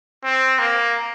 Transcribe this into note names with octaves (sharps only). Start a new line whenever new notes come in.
C4
A#3